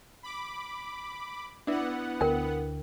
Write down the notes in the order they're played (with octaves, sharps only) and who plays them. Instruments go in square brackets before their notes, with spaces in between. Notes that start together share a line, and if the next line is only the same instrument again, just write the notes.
[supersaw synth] B5 D6
[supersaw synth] B3 F#5 [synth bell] D4 E4
[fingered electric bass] D2 [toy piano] A#4 G5